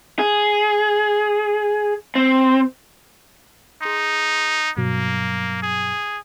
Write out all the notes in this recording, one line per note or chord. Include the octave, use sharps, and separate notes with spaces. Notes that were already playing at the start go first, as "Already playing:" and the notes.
G#4
C4
D#4 G#4 C6
G2 B2 F#3 A#3
G#4